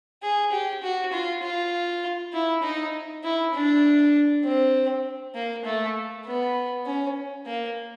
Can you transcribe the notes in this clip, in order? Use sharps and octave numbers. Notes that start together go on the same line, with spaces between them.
G#4
G4
F#4
F4
F4
E4
D#4
E4
D4
C4
A#3
A3
B3
C#4
A#3